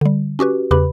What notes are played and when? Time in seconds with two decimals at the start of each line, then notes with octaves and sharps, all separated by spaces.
0.01 D3 G3
0.39 C#4 F#4 G4 B4
0.71 E2 C#3 G4 B4 B5